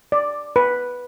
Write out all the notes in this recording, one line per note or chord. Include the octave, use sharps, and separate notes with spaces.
D5
B4